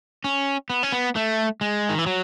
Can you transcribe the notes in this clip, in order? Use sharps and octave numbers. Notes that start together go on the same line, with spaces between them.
C#4
B3
C#4
B3
A3
G#3
D#3
E3
F#3